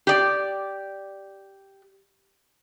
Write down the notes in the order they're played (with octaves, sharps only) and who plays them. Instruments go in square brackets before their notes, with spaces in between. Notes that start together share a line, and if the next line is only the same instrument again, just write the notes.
[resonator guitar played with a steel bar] G4 D5